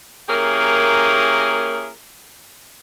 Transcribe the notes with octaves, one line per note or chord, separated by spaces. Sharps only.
A#3 C#4 E4 G4 G#4 A#4